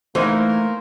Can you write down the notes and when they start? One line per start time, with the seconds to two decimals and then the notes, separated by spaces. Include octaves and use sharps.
0.15 E3 A3 A#3 D#4 E4 A#4 C5 G#5